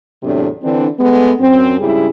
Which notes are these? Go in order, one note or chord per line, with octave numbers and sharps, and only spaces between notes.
E2 A2 C3 F#3 D4
D3 E3 C4 D4
G#3 A3 B3
F#2 C4
G#2 C#3 G3 E4 G#4